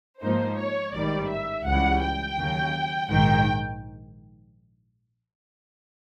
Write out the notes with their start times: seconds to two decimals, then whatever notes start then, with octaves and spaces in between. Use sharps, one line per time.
0.21 G#2 F3 A#3 D#4 C5
0.57 C#5
0.94 A1 G#2 D#3 G3 D5
1.29 E5
1.65 C#2 C#3 E3 G3 F#5
2.02 G5
2.38 D#2 C#3 F#3
3.09 A#1 G#2 D#3 G5